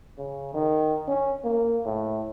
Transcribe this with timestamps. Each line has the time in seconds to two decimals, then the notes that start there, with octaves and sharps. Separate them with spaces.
0.18 C#3
0.54 D#3
1.08 C#4
1.44 A#3
1.85 A2